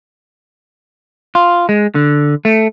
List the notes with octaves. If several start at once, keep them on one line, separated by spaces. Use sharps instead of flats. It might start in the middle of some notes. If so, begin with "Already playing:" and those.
F4
G#3
D3
A3